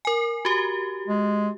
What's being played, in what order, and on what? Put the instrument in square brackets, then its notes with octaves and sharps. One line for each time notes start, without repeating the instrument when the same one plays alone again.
[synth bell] A#4 G#5
F#4 G4
[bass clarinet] G#3